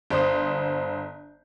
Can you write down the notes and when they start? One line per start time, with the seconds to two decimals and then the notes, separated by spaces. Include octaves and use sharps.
0.11 G1 C5 D#6